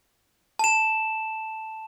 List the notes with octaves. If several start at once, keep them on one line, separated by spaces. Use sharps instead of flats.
A5 E7